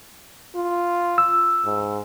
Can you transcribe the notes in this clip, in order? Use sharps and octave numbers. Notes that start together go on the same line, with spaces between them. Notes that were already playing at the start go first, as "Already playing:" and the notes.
F4
E6
G#2